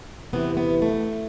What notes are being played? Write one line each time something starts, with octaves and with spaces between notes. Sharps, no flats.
E2 C3 E3 B3
B3
A3